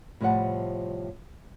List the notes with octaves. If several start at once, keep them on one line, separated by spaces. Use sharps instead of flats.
A2 C3 F3 G3 F#5 A5